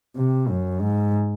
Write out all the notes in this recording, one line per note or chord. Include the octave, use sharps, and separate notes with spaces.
C3
F#2
G#2